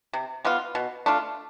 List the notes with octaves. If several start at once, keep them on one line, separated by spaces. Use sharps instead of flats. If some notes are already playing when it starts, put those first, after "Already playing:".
C3
G3 B3 F4
B2
A3 D4 F4